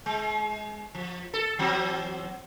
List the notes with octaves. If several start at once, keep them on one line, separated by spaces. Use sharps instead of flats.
G#3
F3
A4
E3 F#3 C4